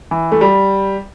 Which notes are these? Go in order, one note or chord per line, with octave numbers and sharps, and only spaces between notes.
E3
A3
G3